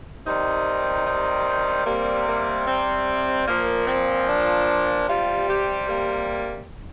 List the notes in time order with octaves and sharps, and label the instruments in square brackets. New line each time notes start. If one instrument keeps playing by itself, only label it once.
[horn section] C3 D#3 G3 D#4
D#4
C3 G3 A#3
A#3
C4
A#2 F3 A#3
C4
D4
C3 G3 F4
G4
A#3